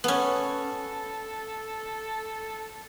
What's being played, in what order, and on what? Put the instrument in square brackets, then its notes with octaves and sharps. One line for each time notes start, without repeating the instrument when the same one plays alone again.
[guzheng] B3 C#4 [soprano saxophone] A4